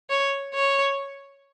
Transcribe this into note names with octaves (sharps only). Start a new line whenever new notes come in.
C#5
C#5